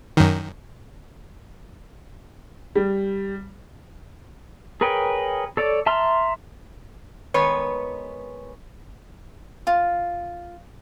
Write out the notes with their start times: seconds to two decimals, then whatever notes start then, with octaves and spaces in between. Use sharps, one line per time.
0.17 F#2 D#3
2.75 G3
4.81 G#4 A#4 B4 C#5 G5
5.57 A4 C#5 D5
5.86 E5 A5 A#5 C6 F6
7.34 D#3 G#3 B3 B4 C#5
9.67 F4